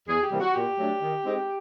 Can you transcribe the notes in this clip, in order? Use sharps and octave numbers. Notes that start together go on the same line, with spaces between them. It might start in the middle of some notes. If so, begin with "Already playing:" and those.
E2 G#4
G4
C3 E3 G3 A#3
F#4
A#2 G4
F#3 A3 D4
D#3
G#3 C4 D#4